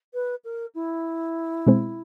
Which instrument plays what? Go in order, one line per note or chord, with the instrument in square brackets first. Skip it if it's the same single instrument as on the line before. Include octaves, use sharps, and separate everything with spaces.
[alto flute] B4
A#4
E4
[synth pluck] B2 G#3 C4